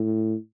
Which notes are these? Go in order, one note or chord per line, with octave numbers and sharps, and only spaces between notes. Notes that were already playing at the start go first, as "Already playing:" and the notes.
Already playing: A2